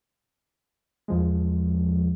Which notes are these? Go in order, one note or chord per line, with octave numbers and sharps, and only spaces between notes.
E2 F3 G#3